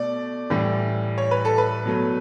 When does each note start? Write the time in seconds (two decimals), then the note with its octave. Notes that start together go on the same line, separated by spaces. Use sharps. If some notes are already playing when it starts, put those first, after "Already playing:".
Already playing: B2 A3 D5
0.50 A2 E3 G3
1.18 C#5
1.31 B4
1.45 A4
1.58 B4
1.86 B2 F#3 A3